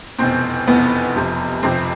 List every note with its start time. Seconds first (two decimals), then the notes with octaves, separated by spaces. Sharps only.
0.19 F1 E2 B2 C4
0.68 F1 E2 B2 B3
1.15 F1 F2 C3 F3
1.63 F1 F2 C3 F3 C4